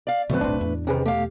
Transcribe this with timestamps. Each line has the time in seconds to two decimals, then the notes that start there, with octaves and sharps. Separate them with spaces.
0.07 D5 F5
0.30 F2 B2 D3 F#3 A3 C4 B4
0.41 D#1 B1 A2 C4 D4
0.61 E2
0.87 C3 D#3 C#4 G#4 B4
1.05 B2 A3 G4 F5